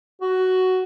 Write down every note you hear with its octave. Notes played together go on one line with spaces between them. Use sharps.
F#4